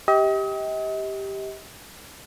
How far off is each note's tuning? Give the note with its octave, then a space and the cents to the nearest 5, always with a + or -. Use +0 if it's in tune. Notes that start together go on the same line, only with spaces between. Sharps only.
G4 +0 D#5 +40